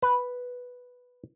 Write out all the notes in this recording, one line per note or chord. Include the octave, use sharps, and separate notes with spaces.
B4